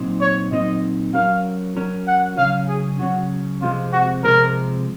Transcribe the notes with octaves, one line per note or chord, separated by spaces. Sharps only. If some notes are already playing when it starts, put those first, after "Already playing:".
Already playing: A#2 F#3 C4 D#4
C#5
A#2 F#3 C4 D#4 D#5
F#3 C#4 F#4 A#4 F5
F#3 C#4 F#4 A#4
F#5
C#3 F#3 C#4 F5
G#4
C#3 F#3 C#4 F#4
C3 F3 G#3 C4 F4
F#4
C3 F3 G#3 C4 A#4